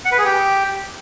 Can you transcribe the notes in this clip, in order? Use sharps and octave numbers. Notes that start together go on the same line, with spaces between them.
F#5
B4
G#4
G4